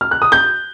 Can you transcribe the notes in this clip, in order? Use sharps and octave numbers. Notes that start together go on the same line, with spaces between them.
F6
F#6
D#6
G6